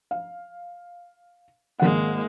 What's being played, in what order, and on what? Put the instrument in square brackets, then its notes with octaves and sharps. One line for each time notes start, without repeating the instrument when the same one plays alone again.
[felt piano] F5
[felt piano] G#1 F#5 [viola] G#3 A#3